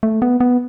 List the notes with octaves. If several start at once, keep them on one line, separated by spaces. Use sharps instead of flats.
A3
B3
B3